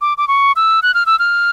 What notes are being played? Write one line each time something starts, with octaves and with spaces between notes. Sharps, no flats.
D6
D6
C#6
E6
F#6
F6
E6
F6